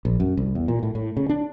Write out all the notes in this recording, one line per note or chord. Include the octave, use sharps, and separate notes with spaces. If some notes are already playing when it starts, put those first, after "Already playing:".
A#1
F#2
C2
E2
A#2
A2
A2
C#3
D4